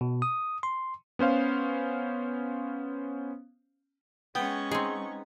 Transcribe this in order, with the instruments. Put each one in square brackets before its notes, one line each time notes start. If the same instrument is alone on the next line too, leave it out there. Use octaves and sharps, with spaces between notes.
[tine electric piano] B2
D#6
C6
[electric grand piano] B3 C#4 C5 F5
[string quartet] G#3 C#4 C#6 [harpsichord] B3 [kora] G5
[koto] C4 G#4 [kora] D#4